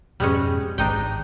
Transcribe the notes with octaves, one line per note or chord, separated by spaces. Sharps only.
F2 G#2 B2 G3 G#3 C#4
G#1 D4 D#4 G5